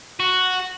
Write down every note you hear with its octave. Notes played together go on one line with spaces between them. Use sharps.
F#4